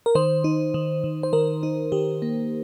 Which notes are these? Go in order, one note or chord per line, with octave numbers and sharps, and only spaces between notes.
A#4
D#3 C5
D#4
D#3
D#3
C5
D#3 A#4
D#4
D#3 G4
A#3